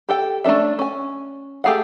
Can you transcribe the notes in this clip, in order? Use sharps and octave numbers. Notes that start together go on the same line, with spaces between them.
G4 A4 G5
A3 C#4 D4 A4 E5
C#4 G#5
A3 G4 G#4 F5 F#5